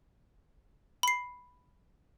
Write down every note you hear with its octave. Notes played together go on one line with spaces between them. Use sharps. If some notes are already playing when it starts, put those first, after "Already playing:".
B5 C7